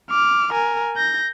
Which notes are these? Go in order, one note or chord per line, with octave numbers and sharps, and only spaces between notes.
D6 F6
A#4 G#5
G6 A#6